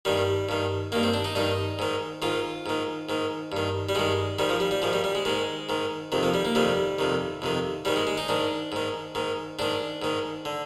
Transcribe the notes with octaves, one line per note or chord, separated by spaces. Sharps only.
G2 D#3 G3
G2 D#3
G2 D#3 A#3
C4
D4
D#4
G2 D#3 D#4
G#2 D#3
G#2 D#3 F4
G#2 D#3
G#2 D#3
G2 D#3
G3
G2 D#3 G#3
G#2 D#3 G3
F3
G3
G3
G#2 D#3 F3
G3
G3
G#3
G#2 D#3 G#3
G#2 D#3
F2 C3 D#3
F3
G3
A#3
F2 C3 D#3 G3
F2 C3 D#3
F2 C3 D#3
G#2 D#3 G3
G#3
G#3
D#4
G#2 D#3 D4
G#2 D#3
G#2 D#3
G#2 D#3 D4
G#2 D#3
D3